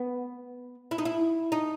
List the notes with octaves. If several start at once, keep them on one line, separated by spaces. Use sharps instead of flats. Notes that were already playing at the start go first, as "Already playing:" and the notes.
Already playing: B3
E4
D#4
E4
D#4